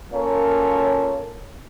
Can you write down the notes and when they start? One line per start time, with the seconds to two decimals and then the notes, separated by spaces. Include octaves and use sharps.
0.12 A#3 C#4 F4 A4 A#4 C#5